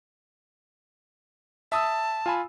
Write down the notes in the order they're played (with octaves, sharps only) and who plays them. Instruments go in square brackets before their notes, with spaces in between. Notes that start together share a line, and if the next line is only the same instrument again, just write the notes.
[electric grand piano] E5 D#6 E6 [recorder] A5
[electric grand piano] F4 G#5 B5